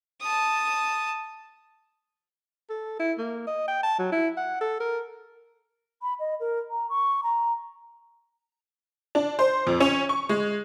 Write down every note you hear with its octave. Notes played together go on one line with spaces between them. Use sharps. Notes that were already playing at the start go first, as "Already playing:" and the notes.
A5 D#6
A4
E4
A#3
D#5
G5
A5
F#3
E4
F#5
A4
A#4
B5
D#5
A#4
A#5
C#6
A#5
D4
C5
F2
C#4
C#6
G#3